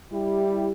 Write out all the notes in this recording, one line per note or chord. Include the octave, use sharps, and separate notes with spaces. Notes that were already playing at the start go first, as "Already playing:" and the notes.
G3 E4 G4